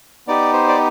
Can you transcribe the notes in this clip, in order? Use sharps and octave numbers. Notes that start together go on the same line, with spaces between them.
B3 D#4 G4 D5
C5
D5